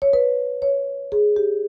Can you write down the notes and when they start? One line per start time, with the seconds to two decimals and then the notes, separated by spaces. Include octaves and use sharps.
0.02 C#5
0.13 B4
0.62 C#5
1.12 G#4
1.36 G4